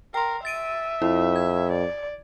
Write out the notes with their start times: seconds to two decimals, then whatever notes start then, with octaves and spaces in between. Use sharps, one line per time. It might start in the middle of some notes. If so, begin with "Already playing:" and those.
0.14 A#4 G5 C6
0.45 E5 A6 D7 D#7
1.02 F2 E4
1.36 G#6
1.72 D5